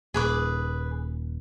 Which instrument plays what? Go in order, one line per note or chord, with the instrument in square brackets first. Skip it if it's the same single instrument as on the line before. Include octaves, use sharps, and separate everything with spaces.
[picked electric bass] D#1 [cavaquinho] G#4 B4 D6